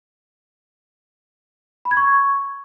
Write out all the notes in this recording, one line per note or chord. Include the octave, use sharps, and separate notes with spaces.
B5
G#6
C#6